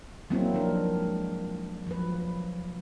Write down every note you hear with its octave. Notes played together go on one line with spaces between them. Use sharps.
F#3 A#3 C4 D#4 E4
F3 D4 A#4
G#3
F3 F#3 B4